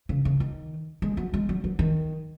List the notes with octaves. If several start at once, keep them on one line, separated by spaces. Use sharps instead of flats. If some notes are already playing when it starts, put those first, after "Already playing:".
C#3
C#3
D#3
G#3
F#3
G#3
F#3
F#3
D#3